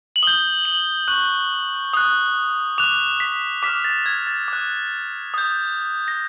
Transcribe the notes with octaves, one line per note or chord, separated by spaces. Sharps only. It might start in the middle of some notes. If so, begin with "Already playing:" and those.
F#7
D#6 G6 G7
F#7
C#6 F#6 F#7
D#6 F#6
D6 F#6 F7
B6
D6 F6 B6
A6
G#6
A6
D6 F#6
D#6 G6
A#6